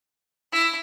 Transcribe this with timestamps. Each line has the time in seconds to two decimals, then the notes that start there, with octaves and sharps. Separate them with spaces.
0.53 E4